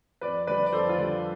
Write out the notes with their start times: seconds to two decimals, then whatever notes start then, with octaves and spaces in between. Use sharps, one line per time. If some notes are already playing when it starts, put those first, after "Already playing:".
0.21 F2 B4 D5
0.47 D3 G3 B4 D5
0.66 D5
0.73 F2 A4 C5
0.89 F4
0.98 D3 G3